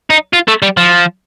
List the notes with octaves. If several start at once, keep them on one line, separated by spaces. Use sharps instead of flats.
D#4
F4
A3
G3
F3